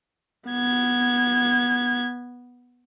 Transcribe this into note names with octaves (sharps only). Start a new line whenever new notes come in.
B3 G#6